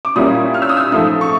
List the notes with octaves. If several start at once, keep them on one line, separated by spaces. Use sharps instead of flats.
D6
A#2 G3 A#3 C#4 E4 D#6
F6
E6
D#6
E6
G#2 F3 A3 D#6
C#6